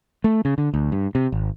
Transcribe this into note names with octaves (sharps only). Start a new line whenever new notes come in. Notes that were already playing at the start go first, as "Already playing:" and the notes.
A3
C#3
D3
D2
G2
C3
G#1